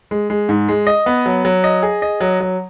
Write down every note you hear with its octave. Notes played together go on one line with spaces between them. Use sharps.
G#3
G#3
G#2
G#3
D#5
B3
F#3
F#3
D#5
G#4
D#5
F#3
F#3